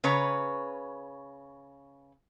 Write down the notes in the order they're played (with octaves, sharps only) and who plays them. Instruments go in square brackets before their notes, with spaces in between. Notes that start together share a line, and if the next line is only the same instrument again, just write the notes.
[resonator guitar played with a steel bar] C#3 B4 C#5 A#5